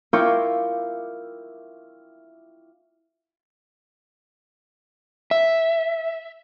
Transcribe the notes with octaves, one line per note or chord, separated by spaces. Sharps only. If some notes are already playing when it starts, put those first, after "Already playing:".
E4 F4 A#4 G5 C#6 D6
E5